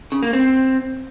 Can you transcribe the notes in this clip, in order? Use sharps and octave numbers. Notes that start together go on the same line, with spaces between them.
C#3
A#3
C4